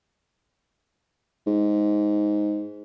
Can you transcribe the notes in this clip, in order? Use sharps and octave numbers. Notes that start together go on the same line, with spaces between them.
G#2